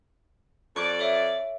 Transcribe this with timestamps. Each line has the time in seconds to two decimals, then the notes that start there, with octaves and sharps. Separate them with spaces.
0.76 F2 D5 C#6 F#6
0.99 A4 C#5 E5